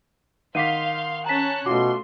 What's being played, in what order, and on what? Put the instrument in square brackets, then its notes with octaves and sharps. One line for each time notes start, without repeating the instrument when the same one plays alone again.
[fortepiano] D#3 F#5 D6 [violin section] F5 C6 [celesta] B6 C7 D#7
[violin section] C#4 A5 F#6 [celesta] A#5 B6
[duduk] B2 [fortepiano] A3 F4 F#4 [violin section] C6 [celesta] D6